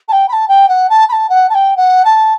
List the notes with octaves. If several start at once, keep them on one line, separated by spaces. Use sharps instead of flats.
A5
G5
B5
A5
G5
F#5
A5
B5
A5
F#5
A5
G5
F#5
A5